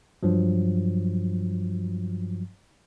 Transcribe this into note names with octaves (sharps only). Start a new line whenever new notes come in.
G2 F3 F#3